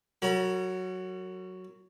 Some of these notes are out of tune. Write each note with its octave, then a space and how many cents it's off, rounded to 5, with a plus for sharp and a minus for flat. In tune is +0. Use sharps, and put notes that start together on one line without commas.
F#3 +0 A#4 -45 A#5 +35